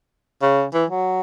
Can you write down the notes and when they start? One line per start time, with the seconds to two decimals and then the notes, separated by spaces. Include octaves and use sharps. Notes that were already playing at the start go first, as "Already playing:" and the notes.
0.42 C#3
0.74 E3
0.90 F#3